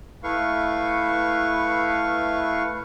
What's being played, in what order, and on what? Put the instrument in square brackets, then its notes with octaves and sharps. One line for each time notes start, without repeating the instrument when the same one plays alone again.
[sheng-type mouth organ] A3 E4 B4 F5 C#6